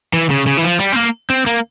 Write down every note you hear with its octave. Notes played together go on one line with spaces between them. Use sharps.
E3
C#3
C#3
E3
F3
G3
C4
A#3
C4
A#3